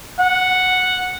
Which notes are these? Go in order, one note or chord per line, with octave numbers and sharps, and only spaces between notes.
F#5